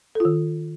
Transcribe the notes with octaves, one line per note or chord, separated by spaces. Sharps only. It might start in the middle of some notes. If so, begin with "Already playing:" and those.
D#3 F4 A4